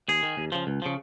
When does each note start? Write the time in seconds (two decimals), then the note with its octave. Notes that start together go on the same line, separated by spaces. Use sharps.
0.08 D#2 G#4
0.23 D#3
0.37 D#2
0.52 C#3 F3
0.67 C#2
0.82 C#3 F3